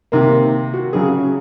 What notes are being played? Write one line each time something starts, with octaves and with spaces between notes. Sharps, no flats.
C3 D#3 A#3
F#4
C#3 F#3 C#4 G#4